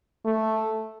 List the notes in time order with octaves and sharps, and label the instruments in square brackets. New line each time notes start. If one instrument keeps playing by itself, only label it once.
[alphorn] A3